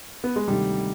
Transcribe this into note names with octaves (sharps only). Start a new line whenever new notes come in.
B3
G#3
D2 C3 D#3 G3